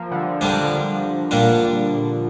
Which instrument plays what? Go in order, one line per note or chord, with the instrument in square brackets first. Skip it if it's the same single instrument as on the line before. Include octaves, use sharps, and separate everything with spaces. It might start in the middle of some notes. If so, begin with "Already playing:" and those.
Already playing: [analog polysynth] F3 A#3
D3 G3
[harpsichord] D3 G3 D4 [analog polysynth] F3 A#3
[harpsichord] A#2 G3 D4